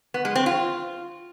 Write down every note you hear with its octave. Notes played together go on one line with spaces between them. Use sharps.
B3
G#3
C4
F4